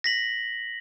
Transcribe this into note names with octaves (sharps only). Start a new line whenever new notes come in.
A#6 B6 F#7